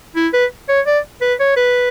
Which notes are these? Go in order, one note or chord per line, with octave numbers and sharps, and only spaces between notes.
E4
B4
C#5
D5
B4
C#5
B4